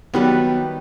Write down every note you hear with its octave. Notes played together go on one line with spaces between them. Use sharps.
D#3 F#3 G3 B3 B4